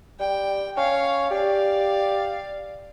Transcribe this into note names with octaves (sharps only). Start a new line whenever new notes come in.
G3 G5
C#4 C#5 F5
G4 D5 F5